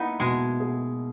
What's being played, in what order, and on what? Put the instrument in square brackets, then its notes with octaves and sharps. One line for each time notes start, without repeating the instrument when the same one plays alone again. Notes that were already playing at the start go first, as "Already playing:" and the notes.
Already playing: [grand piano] A#3 E4 [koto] B3 D#4
[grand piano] B2 [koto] G#3
[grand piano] G#4